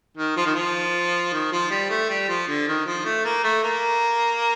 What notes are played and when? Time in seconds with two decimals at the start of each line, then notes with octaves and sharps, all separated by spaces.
0.17 D#3
0.37 F3
0.46 D#3
0.54 F3
1.33 D#3
1.52 F3
1.71 G3
1.90 A3
2.09 G3
2.28 F3
2.48 D3
2.67 D#3
2.86 F3
3.05 A3
3.25 A#3
3.44 A3
3.63 A#3